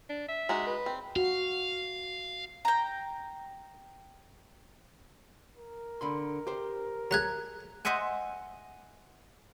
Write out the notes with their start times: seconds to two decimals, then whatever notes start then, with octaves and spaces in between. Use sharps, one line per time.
0.09 D4
0.28 E5
0.49 G#3 D#4 F#4
0.67 B4
0.86 C4
1.16 F#4 F5
2.65 G5 A#5
5.56 A#4
6.01 D3 B5 C6
6.47 G4 C5
7.11 F#3 A3 G#4 A#5 F#6 G#6
7.85 C5 D#5 E5 F#5 G#5